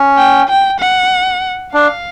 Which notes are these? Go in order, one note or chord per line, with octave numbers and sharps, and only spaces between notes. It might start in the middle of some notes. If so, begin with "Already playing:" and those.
Already playing: C#4
G5
G5
F#5
D4 F5